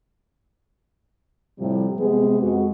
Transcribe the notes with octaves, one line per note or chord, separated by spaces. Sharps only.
A2 C3 F3 G3
C3 G#3 B3 G#4
F2 G#3 F#4